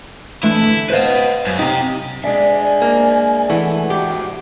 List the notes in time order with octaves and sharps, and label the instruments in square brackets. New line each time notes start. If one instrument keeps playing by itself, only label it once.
[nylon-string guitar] E3 A3 D4 [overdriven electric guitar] E4
[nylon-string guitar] D3
[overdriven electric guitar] B4 D#5 [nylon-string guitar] C5 F5
[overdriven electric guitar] F#2
[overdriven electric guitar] C3 G4 [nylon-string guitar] D#4
[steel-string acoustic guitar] G#3 D4 [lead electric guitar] D5 E5 [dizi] G#5
[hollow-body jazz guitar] A#3
[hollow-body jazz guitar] E3 A3 [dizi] F#5
[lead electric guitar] G#2 F#4 [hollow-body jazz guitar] G4